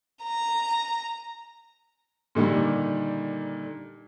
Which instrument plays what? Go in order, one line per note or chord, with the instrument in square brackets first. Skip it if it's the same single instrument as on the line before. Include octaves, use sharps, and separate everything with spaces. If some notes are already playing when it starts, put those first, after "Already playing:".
[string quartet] A#5
[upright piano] A#2 D3 D#3 G3